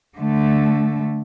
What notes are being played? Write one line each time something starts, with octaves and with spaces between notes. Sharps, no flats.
D3 A3